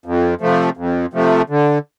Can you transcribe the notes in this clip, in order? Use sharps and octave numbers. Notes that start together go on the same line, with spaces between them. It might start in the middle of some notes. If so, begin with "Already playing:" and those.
F2
C3 F3 A3
F2
C3 F3 A3
D3